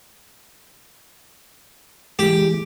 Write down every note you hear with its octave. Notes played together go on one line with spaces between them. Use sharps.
E3 G#3 G4